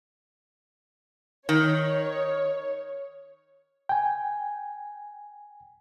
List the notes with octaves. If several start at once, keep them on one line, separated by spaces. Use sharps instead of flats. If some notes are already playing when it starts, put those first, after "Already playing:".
D#3 C#5
G5 G#5